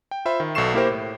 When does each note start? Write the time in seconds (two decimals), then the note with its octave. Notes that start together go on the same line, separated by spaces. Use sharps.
0.11 G5
0.25 F4 C5 E5 B5
0.40 D#3
0.55 B1 B2 A4 C#6 C7 E7
0.74 A#3 E4 G4 A#4 C5
0.91 A2